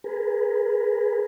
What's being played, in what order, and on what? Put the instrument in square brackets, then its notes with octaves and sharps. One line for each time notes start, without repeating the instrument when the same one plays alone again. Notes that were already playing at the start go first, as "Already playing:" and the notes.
[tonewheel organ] G#4 A#4 B4